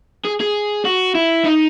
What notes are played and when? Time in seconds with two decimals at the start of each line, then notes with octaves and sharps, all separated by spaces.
0.25 G#4
0.41 G#4
0.85 F#4
1.15 E4
1.45 D#4